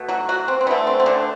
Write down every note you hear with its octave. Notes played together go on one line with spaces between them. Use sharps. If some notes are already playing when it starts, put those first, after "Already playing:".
Already playing: B2 A3
F#3 F#4
F#3 F#4
C4
C4
D3 A3 B3
C4
C4
D3 D4